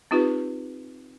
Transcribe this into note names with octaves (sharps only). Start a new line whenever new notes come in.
C4 D#4 F4 G4 B4